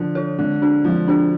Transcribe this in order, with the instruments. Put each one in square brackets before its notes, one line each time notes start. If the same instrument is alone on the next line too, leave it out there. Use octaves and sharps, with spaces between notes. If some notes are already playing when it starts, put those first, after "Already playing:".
Already playing: [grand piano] D3 F3
[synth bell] F4 A4
[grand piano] D3 [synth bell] G#3
[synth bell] D4 G#4
[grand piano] F3 [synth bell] G#3
[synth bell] D4 G#4